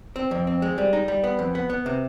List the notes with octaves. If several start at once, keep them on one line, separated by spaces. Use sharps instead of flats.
C4
F2
C4
G#3
G3
D#4
G3
B3
F2
B3
B3
C3